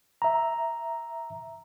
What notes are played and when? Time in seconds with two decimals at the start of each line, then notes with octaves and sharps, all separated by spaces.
0.22 E5 A#5